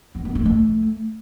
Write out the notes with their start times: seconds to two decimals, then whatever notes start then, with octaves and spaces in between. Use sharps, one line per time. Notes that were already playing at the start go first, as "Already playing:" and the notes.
0.15 B3
0.25 B3
0.35 A3
0.46 A3